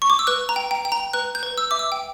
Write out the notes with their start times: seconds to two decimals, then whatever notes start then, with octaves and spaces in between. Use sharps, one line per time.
0.02 C#6
0.10 D6
0.19 E6
0.27 B4 F#6
0.49 A#5
0.56 G5
0.71 G5
0.85 G5
0.92 A#5
1.13 B4 F#6
1.35 G6
1.43 B4
1.58 E6
1.71 E5 D6
1.79 E6
1.92 G5